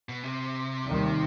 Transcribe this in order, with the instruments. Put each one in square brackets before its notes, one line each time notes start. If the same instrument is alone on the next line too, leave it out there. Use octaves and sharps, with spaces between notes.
[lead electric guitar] B2
C3
[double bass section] D#2 D#3 G3